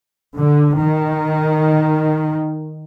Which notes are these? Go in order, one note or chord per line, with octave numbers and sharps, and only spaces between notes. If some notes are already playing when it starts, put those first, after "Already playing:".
D3
D#3